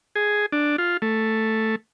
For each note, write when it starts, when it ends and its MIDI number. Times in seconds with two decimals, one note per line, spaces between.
0.16 0.46 68
0.52 0.76 62
0.78 0.97 65
1.02 1.76 57